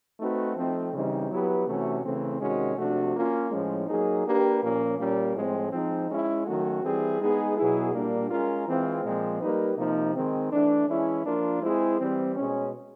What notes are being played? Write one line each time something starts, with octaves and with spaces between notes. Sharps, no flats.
A3 C4 D#4 F#4 B4
F3 A3 C4 D#4
C#3 E3 G3 C4 D#4
F#3 B3 E4 G4 B4
C3 E3 A3 C#4 F#4
C#3 E3 A3 C4
C3 D#3 G#3 C#4 F#4
C3 F3 A3 D4 F#4
A#3 C#4 F4
A2 F3 G#3 C#4
F#3 A#3 D#4 G#4
A#3 D4 G4 B4
A#2 F3 A#3 C#4
A#2 G3 A#3 C#4
A2 F3 G#3 C4
F3 G#3 C4 D#4
G#3 C#4 E4
D#3 F#3 A3 C#4 F#4
E3 G3 C4 E4 G#4
G#3 B3 D#4 G#4 B4
B2 F#3 B3 E4 G#4
A#2 G3 A#3 D4
G#3 C#4 F4 A#4
E3 G#3 C4 F4
A#2 F3 G#3 C4
G3 A#3 D#4 G4 B4
C3 F3 A#3 D#4
D#3 G#3 C4
E3 A3 D4
E3 G#3 C#4 E4
F3 A#3 D4 F4 A#4
G#3 C4 E4 G#4 C5
E3 G3 C4
B2 G#3 C#4